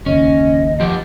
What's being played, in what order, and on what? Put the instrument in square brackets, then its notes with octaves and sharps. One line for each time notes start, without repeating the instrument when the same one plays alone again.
[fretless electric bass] F#1 D#2 [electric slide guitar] C#4 [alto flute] D#5
[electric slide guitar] F3 G4